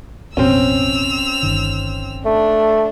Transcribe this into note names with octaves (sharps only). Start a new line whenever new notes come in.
A1 F2 B2 C4 C#4 E6 F7
G1 D#3
A3 D4